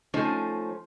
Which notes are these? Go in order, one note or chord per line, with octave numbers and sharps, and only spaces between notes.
F3 A3 C#4 D#4 C5